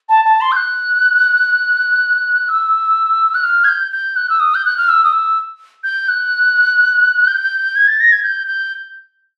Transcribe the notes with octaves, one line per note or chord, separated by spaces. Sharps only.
A5
A5
C6
G6
F#6
E6
F#6
F6
G#6
G6
G6
F#6
E6
D#6
G6
F#6
F6
E6
D#6
E6
G6
F#6
G6
G#6
A6
A#6
G#6
G6
G6